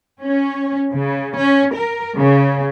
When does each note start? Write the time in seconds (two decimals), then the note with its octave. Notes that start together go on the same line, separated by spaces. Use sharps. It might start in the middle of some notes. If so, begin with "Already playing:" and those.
0.22 C#4
0.93 C#3
1.39 C#4
1.74 A#4
2.18 C#3